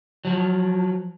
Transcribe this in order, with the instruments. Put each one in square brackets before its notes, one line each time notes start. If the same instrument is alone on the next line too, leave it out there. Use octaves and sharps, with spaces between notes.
[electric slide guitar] F3 F#3